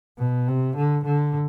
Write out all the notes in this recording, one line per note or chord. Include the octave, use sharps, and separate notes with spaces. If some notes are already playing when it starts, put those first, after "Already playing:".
B2
C3
D3
D3